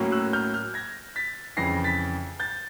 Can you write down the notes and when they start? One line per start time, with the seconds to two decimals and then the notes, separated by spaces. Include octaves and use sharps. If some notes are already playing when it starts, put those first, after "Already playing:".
Already playing: A2 F#3 A#3 C#4
0.12 E6 F#6
0.33 F6 G6
0.54 F6 G6
0.74 G#6 A#6
1.16 A6 B6
1.57 F2 C#3 E3 A#6 C7
1.84 A6 B6
2.40 G6 A6